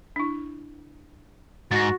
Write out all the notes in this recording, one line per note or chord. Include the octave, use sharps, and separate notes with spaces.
D4 E4
G#2 F#4 A6 A#6